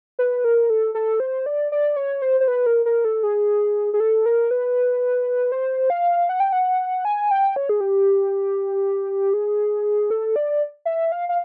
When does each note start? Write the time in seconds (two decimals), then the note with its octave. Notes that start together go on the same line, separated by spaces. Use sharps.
0.19 B4
0.44 A#4
0.70 A4
0.95 A4
1.20 C5
1.46 D5
1.72 D5
1.96 C#5
2.22 C5
2.40 C5
2.48 B4
2.66 A#4
2.86 A#4
3.05 A4
3.23 G#4
3.94 G#4
4.00 A4
4.26 A#4
4.51 B4
5.52 C5
5.90 F5
6.29 F#5
6.40 G5
6.53 F#5
7.05 G#5
7.31 G5
7.56 C#5
7.69 G#4
7.81 G4
9.34 G#4
10.10 A4
10.36 D5
10.85 E5
11.12 F5
11.29 F5